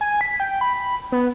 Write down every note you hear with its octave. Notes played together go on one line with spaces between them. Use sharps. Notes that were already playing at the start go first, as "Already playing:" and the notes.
G#5
B6
G5
B5
B3